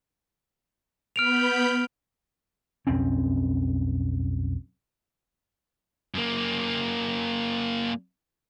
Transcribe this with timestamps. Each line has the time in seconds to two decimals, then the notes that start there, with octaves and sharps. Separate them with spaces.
1.16 B3 B5 F6 G6 D7 F7
2.87 B1 F2 C4 C#4
6.14 F#2 A#3